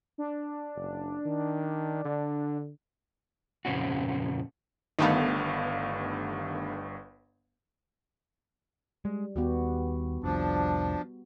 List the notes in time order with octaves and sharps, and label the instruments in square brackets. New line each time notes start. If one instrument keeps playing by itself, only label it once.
[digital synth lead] D4
[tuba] F#1
D#3
D3
[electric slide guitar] F2 A#2 C#3 C4 C#4 F#4
[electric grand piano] G1 G2 F5 [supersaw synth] D#3 A3 B3
[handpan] G3 [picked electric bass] G#3
[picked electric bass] D#2 [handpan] B3 F#4 G4
[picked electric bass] F1 C2 [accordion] F3 D4